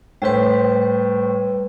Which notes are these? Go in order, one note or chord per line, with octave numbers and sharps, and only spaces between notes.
A2 G3 B4 C5